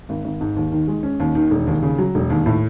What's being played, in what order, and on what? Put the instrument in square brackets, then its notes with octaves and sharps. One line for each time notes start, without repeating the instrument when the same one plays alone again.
[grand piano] G#1
G#1
G#2
D#2
D#3
G#3
C#4
D#2
D#3
E1
D#2
C#3
F#3
E1
D#2
A2